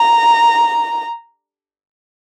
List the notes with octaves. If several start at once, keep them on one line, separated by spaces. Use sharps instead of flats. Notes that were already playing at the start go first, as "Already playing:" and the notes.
Already playing: A#5